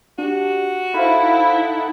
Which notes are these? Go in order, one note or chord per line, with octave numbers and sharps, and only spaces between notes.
D4 F#4 G4
D#4 E4 A4 C5 F5 F#5 B5